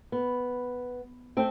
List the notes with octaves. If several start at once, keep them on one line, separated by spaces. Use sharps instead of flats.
B3
A3 C4 G5